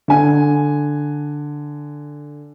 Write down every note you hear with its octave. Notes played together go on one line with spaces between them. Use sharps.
D3 G#5